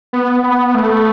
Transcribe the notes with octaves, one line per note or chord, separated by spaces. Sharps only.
B3
B3
A3